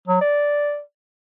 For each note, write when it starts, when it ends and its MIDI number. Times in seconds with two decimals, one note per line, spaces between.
0.08 0.21 54
0.21 0.80 74